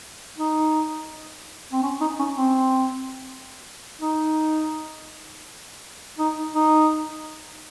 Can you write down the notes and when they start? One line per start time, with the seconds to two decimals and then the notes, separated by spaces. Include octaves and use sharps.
0.38 D#4
1.73 C4
1.83 C#4
2.01 D#4
2.19 C#4
2.37 C4
4.01 D#4
6.19 D#4
6.55 D#4